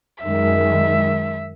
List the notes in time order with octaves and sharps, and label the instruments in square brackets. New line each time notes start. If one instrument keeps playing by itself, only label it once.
[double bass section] F#2 D#3 G#3 [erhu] E5